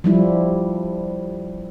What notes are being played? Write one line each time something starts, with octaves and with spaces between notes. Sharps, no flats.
F3 G3 E4